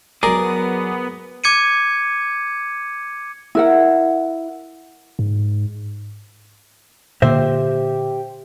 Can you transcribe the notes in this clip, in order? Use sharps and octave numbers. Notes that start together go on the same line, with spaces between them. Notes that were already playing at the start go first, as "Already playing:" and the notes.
F#3 B3 G#4 A#4 D5 A#6
D6 G#6 C#7 D#7
E4 A#4 F#5
G#2
A#2 D3 A#3 G4 C5 E5